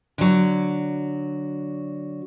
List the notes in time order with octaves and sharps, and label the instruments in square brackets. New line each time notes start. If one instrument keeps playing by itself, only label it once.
[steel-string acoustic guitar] D3 F#3